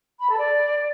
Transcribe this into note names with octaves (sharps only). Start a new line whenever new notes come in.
B5
A4
D5